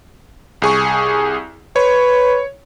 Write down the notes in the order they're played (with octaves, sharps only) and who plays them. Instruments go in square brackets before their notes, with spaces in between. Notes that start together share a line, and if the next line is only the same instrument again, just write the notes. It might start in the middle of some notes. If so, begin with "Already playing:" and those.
[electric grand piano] C2 G#4 C#6
[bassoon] B4 [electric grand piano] C#5